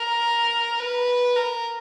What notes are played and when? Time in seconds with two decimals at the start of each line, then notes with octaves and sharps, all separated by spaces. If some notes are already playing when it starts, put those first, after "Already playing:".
Already playing: A#4
0.79 B4
1.36 A#4